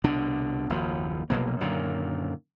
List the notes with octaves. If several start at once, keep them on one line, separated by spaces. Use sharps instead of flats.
C2 B2 D3 D4
F#1 D#2 F3
F1 B1 B2 A#3
F#2 A#2 D3 D#3